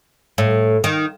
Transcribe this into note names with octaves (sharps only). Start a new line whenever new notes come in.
A2
D#3